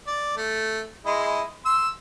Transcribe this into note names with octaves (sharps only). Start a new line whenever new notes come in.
D5
A3
G#3 E4 D#5
C6 E6